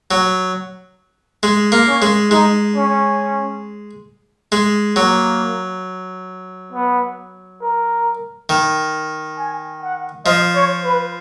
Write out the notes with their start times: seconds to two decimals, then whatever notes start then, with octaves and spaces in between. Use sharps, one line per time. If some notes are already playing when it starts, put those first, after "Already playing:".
0.11 F#3
1.43 G#3
1.72 A#3
1.87 C#4
2.02 G#3
2.31 G#3 D#4
2.76 C#4
4.52 G#3
4.96 F#3 A#3
6.73 B3
7.61 A#4
8.49 D#3
9.38 G#5
9.82 F#5
10.26 F3 D#5
10.55 C#5
10.85 B4